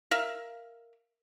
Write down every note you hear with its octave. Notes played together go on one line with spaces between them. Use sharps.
A#4 E5 F5